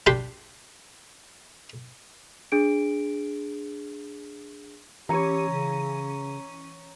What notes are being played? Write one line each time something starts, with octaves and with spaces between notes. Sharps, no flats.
G3 D4 G4 C6
D4 G#4 D7
E3 C#4 G4 C#5 A#5 D#7
C#3